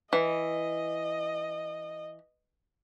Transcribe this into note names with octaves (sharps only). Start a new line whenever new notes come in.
E3 D#5